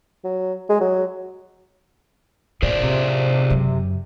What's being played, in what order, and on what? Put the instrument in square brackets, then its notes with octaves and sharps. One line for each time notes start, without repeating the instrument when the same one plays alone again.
[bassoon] F#3
G#3
F#3
[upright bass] A2 C3 [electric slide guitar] G#4 C5 D5
[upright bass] A2 [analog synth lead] C3
[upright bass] F#2 C#3